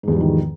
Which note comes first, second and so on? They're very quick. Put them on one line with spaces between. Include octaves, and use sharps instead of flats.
G#2 E2 G3 F3 D#3